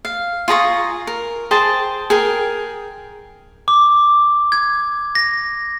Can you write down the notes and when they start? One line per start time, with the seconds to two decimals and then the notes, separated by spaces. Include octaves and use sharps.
0.05 F5
0.48 F4 G#4 A#5 C#6
1.07 A#4
1.51 G#4 C5 G5 A5
2.10 G#4 A#4 G5
3.68 D6
4.52 G#6
5.15 A#6